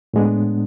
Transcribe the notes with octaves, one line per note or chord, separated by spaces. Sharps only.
A2 G#3 B3 D4